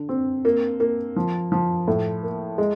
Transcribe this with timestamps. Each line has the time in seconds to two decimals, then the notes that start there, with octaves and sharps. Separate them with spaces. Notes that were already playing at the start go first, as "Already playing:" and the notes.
Already playing: D3
0.09 C4
0.45 A#3
0.80 A#3
1.16 F3
1.52 F3
1.88 A2
2.23 A#3
2.58 G#3